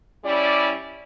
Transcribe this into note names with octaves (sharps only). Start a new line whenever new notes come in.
G3 C#4 E4 D5